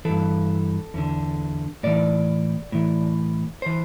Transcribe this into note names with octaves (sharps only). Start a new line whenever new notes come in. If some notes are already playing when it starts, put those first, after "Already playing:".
G2 E3 A4
E2 D3
A2 E3 D5
A2 E3
E3 C5